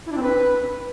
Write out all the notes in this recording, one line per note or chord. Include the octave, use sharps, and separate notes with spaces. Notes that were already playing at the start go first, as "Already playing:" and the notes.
E4
D4
C4
B4